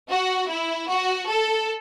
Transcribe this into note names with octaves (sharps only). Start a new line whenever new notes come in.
F#4
E4
F#4
A4